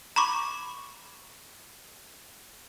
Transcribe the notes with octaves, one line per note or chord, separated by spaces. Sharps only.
A#5 B5 C#6 D6